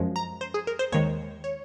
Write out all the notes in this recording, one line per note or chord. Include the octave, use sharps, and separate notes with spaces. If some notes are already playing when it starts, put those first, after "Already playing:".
Already playing: F#2 F3 G#3
A#5
C5
G#4
A#4
C5
D#2 D#3 G#3 C#5
C#5